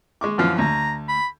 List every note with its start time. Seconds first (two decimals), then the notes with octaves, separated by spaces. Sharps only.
0.21 G#3 C#6 D6
0.38 F#2 E3 F3 F5
0.58 D2 A#5
1.08 B5